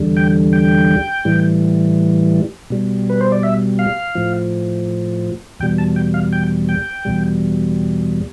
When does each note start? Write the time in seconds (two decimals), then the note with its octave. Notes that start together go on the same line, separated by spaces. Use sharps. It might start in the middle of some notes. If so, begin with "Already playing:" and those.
Already playing: E2 D3 G3
0.17 G5
0.53 G5
1.25 A2 E3 G3
2.70 B2 G3
3.10 B4
3.21 C5
3.32 D5
3.43 E5
3.79 F5
4.15 A2 F3
5.60 E2 B2 G3 G5
5.78 A5
5.96 G5
6.14 F5
6.33 G5
6.69 G5
7.05 E2 B2 G3